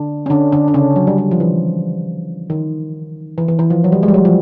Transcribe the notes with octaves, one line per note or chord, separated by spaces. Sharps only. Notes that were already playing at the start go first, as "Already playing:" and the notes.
Already playing: D3 D4
C#4
D3 D4
D3 D4
D4
C#3 C#4
F#3
G3
G3
F3
E3
D#3
E3
E3
E3
F3
F#3
G3
G#3
G3
F#3
F3